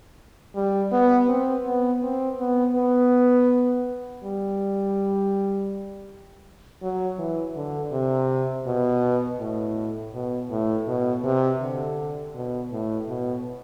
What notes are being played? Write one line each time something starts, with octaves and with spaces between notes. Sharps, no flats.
G3
B3
C4
B3
C4
B3
B3
G3
F#3
E3
D3
C3
B2
A2
B2
A2
B2
C3
D3
B2
A2
B2